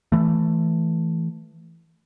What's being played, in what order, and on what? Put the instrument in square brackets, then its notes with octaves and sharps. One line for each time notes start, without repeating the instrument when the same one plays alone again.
[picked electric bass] E3 A3